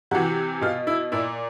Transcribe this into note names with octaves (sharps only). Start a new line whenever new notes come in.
C3 E3 F#4
B2 F4
E4
A#2 E4